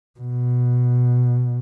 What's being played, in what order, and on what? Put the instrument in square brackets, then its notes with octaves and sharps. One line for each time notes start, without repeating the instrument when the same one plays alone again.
[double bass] B2